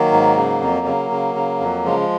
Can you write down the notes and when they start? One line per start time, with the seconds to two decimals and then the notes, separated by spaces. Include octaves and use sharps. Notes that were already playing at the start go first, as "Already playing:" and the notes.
Already playing: D#3 F#3 A#3
0.12 G#2
0.37 C#3
0.62 F2
0.86 C#3
1.11 C#3
1.35 C#3
1.60 F2
1.84 C#3 F3 G#3